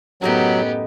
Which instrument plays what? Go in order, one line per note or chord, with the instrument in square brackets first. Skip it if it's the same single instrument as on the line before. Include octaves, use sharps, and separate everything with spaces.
[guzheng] F#2 A2 D#4 [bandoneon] F#3 [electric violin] B3 G4